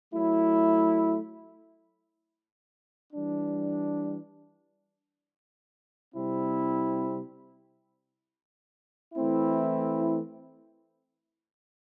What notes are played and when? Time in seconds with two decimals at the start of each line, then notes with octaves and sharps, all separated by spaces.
0.13 F#3 A3 E4
3.13 E3 G3 D4
6.14 C3 G3 C4 E4
9.14 E3 A3 C4 E4